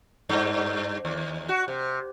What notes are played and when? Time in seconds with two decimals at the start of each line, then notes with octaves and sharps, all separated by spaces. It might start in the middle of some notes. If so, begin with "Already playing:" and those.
0.29 G2
1.05 D#2
1.49 F#4
1.68 C3